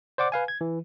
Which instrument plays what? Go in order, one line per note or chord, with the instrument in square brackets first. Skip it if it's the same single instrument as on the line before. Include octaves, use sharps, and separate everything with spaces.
[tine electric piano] C5 D5 F#5 D6
B4 F5 G#5
G#6
E3